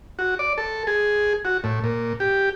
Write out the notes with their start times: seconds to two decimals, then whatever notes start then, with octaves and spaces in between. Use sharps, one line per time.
0.19 F#4
0.39 D5
0.58 A4
0.87 G#4
1.45 F#4
1.64 A2
1.84 A#2
2.20 G4